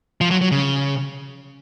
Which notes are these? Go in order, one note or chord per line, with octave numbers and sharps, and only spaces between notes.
F3
F#3
F#3
C#3